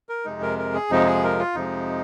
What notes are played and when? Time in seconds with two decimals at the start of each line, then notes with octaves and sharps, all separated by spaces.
0.09 A#4
0.25 F2 C3 G#3 D#4
0.42 A#4
0.59 A#4
0.74 G#4
0.90 F2 C3 F3 G#3 D#4
1.07 G#4
1.24 A#4
1.39 F4
1.55 F2 C3 F3 G#3 D#4